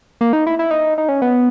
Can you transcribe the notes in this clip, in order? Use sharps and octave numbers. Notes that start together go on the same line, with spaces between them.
A#3
D#4
E4
E4
D#4
D#4
C#4
B3